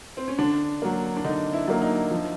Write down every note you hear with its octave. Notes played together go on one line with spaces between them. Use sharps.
C4
C#4
D3 D4
F#3 A#3
D4
D3 D#4
E4
F#3 A#3
D#4
F3